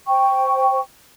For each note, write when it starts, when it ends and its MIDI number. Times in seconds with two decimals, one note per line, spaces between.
0.08 0.80 72
0.08 0.80 79
0.08 0.80 85